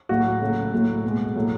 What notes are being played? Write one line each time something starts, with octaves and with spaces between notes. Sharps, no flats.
A2 F#3 A3 F#4
C#3 F#3 A3
A2 F#3 A3
B2 G#3
A2 F#3 A3